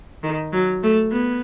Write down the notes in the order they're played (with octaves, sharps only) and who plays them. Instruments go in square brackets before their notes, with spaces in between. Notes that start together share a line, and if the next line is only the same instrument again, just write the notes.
[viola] D#3
F#3
A3
B3